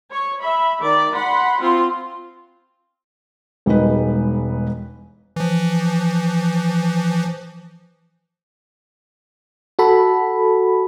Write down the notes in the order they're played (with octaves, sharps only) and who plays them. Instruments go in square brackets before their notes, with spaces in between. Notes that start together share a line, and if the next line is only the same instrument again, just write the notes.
[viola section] C#5
E5 B5
D#3 D5
F#5 B5 C6
C4 F4 C6
[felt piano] E1 G3 G#3 D#4 B4
[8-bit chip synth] E3 F3
[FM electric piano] F#4 A4 B5